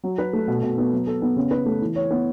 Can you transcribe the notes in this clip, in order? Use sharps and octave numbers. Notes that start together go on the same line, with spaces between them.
F#3
B4
A3
B2
B2
B3
F#3
A4
B3
C#3
B4
A3
E3
C#5
B3